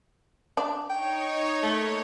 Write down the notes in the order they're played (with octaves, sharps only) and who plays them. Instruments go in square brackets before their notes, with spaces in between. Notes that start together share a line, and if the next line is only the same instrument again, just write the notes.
[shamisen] D4
[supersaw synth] D#4 C#5 [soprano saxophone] G5
[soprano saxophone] A3 [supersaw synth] A#3 C#5